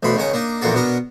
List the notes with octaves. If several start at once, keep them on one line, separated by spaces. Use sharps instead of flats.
A1 D2 B2 B5 C6
C#2 D#3 C#4 F#5 D6
A#3 D4 D#4
A#1 E2 A#2 A#3 F#4 A4
B2 B3 D4 A#4